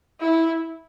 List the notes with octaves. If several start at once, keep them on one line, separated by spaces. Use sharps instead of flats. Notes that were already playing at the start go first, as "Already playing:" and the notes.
E4